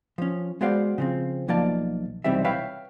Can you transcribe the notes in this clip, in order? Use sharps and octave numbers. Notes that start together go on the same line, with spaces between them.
F3 C#4
G#3 B3 F#4 C5 D5 F5
C#3 F3 C4
B1 F3 A#3 D5 F5 A5
B1 C3 E3 G3 C4 E5
B4 C#5 E5 F5 G5 B5